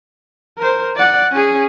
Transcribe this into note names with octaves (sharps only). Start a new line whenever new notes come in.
A#4 C5
D5 F#5
C#4 G#4